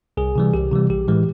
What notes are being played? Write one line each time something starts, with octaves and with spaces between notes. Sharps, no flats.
C2 G#4
C3 E3 G3
C2 G4
C3 E3 G3
A#1 G4
A2 E3 G#3